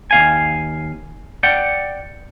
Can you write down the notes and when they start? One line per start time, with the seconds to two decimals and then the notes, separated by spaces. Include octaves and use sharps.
0.11 D#2 F5 G#5
1.43 D5 F#5 G5